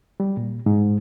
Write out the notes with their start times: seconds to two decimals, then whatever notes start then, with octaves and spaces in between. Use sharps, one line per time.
0.20 G3
0.37 A#2
0.66 G#2